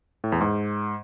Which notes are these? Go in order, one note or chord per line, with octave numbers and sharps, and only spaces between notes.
A2
E2
G#2